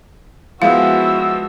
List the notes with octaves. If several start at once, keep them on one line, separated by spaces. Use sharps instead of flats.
F3 G#3 B3 E4 F#4 F5 E6